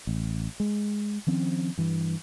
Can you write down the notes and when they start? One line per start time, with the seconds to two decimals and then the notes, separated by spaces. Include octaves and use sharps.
0.07 A1
0.60 G#3
1.27 D#3 F3 C4 C#4
1.78 G2 E3